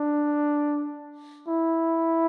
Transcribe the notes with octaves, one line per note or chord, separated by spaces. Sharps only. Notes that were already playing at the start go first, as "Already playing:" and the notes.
Already playing: D4
E4